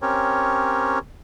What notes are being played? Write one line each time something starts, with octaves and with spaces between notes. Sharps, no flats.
C4 C#4 G4 A#4 C#5